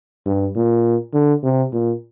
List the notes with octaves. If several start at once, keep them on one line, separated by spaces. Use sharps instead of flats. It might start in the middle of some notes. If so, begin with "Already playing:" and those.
G2
A#2
D3
C3
A#2